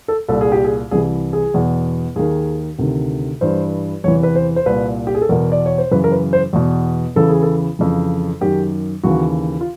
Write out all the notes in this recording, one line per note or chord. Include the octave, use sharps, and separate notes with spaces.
A4
C2 A#2 A4
G#4
G4
G#4
C2 C3 E3 G#4
G#4
E2 B2
D#2 D#3 G#4
D2 C3 D#3
G2 E3 C5
E2 C3 E3 C#5
B4
C5
C5
C2 A#2 B4
G4
G#4
A4
E2 B2 A#4
D5
C#5
C5
F#2 C#3 E3 B4
A#4
B4
C5
E2 B2
E2 C#3 E3 A4
G#4
A4
F2 C#3 E3
F#2 D#3 G4
D#2 C#3 E3 F#4
F4